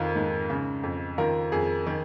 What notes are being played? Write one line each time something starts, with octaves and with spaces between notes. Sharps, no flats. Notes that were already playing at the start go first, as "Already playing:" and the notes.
Already playing: F2 D#3 F4 A#4
G#2
C#3
F2
D#3 F4 A#4
F2 G#4
D#3